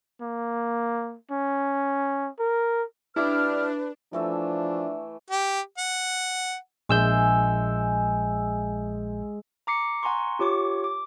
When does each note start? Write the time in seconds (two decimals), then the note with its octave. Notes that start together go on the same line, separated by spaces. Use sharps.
0.21 A#3
1.31 C#4
2.39 A#4
3.16 G3 D4 E4 B4 D6 F6
4.13 E3 F3 A3 D4 E5
5.31 G4
5.78 F#5
6.89 A#1 G#3 G#4 E5 E6 G6
9.67 A#5 D6 C7 C#7
10.03 F#5 G#5 A#5 C6 C#6
10.39 F4 G4 C#5 C#6 D6
10.84 D6